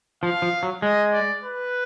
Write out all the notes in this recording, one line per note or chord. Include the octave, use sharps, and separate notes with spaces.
F3 F5
F3
F#3
G#3 D#5
D5
B4